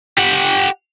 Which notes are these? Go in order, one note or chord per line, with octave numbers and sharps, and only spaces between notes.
G4 F#5